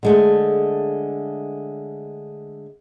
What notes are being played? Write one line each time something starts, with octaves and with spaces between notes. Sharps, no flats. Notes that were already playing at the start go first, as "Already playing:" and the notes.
D3 G#3 A3